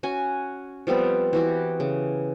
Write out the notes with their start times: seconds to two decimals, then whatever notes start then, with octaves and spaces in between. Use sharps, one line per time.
0.03 C#4 F#4 G#5
0.87 F3 G3 B3 C4
1.33 E3 F#4 G4
1.80 C#3